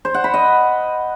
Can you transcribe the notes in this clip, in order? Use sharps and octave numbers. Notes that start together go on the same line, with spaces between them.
C5
F#5
B5
D#5